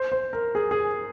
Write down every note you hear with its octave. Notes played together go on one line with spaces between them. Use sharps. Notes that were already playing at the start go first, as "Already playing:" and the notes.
Already playing: C5
C5
A#4
G#4
G#4